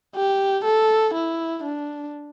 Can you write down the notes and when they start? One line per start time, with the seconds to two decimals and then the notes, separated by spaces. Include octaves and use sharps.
0.16 G4
0.65 A4
1.14 E4
1.63 D4